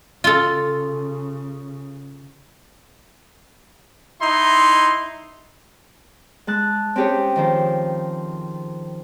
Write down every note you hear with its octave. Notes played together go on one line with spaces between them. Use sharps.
C#3 F4 A4
D#4 E4 C6
G#3 A5 F#6
C4 C#4 G4 G#4 C#5
D#3 F3 C5